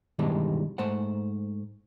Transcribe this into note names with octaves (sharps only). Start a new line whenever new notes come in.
G2 B2 D#3 E3 G3 G#3
G#2 A3 C5 F#5